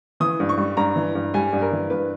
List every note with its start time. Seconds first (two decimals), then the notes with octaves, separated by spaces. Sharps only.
0.20 E3 D#6
0.40 G2
0.49 C#6
0.57 G3
0.77 G2 A#5
0.96 E3
1.15 G2
1.34 G3 G#5
1.53 G2
1.62 A#4
1.72 E3
1.90 G2 B4